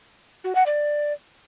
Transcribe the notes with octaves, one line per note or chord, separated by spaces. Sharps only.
F#4
F#5
D5